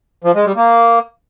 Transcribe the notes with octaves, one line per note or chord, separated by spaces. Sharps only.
F3
G#3
G3
A#3